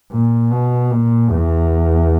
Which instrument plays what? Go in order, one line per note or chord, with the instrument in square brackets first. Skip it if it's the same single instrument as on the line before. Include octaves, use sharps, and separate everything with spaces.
[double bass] A#2
B2
A#2
E2